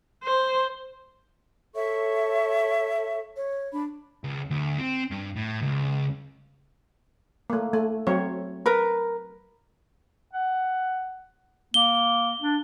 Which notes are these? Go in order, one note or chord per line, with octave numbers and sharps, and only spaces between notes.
C5
A4 C#5 E5 C#6
C#5
D4 B5
C#2
D2
C4
G2
A2
C#2
A3 A#3
A3
F#3 C4 C#5
A#4 B4
F#5
A#3 G7
D4